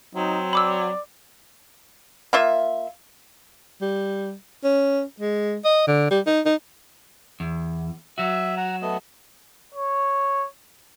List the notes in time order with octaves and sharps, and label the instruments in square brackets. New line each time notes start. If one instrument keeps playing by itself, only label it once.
[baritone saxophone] F#3 [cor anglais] C4 [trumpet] D#4
[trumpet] D5 [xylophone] B5 D6 E6
[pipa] A#3 F4 E5
[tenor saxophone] G3
C#4
G#3
D#5
D3
G3
D#4
D#4
[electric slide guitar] E2
[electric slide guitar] F#3 F#4 [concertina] E5
[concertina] F#5 A#5
A3 B3 D#5
[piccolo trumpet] C#5